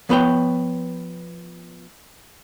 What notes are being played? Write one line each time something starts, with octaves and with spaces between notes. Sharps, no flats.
F3 B3 B4 C#5 G5